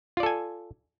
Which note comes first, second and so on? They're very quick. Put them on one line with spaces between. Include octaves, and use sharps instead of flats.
F4 D5 A4 G#5